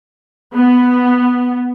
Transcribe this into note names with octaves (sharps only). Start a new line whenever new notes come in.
B3